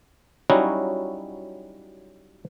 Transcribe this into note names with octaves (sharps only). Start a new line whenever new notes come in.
F#3 G3 C#4 D#4 E4 F#4